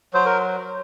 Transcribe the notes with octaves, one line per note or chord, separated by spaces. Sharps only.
F#3 C5
A#4